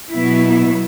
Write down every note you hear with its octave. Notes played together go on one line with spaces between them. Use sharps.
B2 F#3 B3 E4